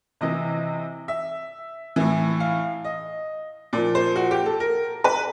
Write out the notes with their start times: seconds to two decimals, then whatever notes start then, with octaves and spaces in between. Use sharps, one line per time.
0.21 C3 E3 D#5
1.08 E5
1.96 A2 E3
2.40 F5
2.84 D#5
3.73 A#2 F3 D5
3.95 C5
4.16 F#4
4.31 G4
4.46 A4
4.60 A#4
5.04 B4